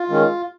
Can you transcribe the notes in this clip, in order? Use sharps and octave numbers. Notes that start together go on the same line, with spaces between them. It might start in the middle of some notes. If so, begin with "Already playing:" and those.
Already playing: F4
D#3 G#3 C#4